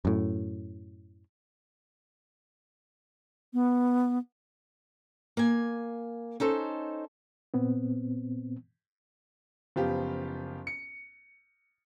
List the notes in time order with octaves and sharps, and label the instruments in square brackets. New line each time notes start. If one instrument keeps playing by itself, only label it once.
[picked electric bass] F#2 A2
[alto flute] B3
[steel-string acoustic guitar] A#3 G#5
C#4 D#4 A4 C5
[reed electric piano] A#2 B3 C4
[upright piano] F#1 F3 B3 F4 G4
C#7